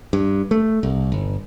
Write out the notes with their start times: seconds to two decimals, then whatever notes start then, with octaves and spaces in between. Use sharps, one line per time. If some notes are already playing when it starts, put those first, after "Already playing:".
0.13 G2
0.51 A3
0.83 C2
1.12 G1